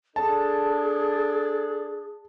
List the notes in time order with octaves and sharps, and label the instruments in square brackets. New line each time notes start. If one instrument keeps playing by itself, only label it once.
[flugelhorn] D4 [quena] G#4 [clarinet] A4 [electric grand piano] A5